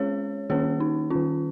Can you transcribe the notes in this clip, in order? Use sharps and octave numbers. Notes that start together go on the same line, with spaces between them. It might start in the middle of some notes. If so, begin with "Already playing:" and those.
Already playing: G#3 C#4 G#4 C#5
D#3 A#3 C#4 G#4 C#5
D#4
D#3 C#4 F4